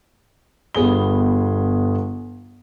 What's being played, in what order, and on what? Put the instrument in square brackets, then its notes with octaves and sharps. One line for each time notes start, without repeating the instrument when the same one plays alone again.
[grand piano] G1 G3 B3 G#4 G7